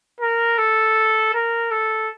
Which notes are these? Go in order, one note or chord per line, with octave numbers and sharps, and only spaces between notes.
A#4
A4
A#4
A4